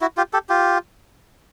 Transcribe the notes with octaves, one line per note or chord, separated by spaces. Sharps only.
E4 F#4
F4 G4
G4 A4
F4 G4